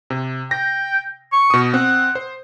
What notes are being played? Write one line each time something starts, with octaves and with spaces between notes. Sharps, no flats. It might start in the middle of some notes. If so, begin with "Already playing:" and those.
C3
G5 A#6
C#6
B2 D#6
C4 F#5
C5